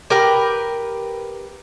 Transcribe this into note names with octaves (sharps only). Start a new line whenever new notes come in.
G4 A#4 B4 G5